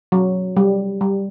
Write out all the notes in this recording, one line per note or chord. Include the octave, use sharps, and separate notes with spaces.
F#3
G3
G3